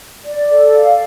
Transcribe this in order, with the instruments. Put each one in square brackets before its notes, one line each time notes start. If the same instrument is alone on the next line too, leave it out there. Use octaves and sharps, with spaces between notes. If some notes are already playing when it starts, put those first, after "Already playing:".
[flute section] D5
A4
F5